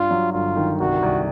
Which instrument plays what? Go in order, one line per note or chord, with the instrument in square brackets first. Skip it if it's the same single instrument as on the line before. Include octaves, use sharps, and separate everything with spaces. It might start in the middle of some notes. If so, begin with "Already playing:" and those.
Already playing: [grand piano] G2 [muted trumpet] F4
[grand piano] F#3
[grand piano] G1 [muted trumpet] F4
[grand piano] D#3
[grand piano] C2 [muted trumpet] F#4
[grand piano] C2